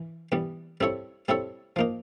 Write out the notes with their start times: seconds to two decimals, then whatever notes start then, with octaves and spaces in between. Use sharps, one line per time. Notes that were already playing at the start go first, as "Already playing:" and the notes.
Already playing: E3
0.32 E3 G3 B3
0.81 G3 C4 E4 A4 C#5
1.28 G3 C4 E4 A4 C#5
1.76 F3 A#3 D#4